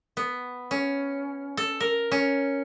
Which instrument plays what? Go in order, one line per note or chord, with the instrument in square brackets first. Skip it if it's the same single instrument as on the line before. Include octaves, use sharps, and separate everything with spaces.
[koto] B3
C#4
A4
A#4
C#4